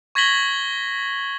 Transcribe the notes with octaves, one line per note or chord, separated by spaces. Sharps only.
C#6 G#6 A#6 B6 F#7 G7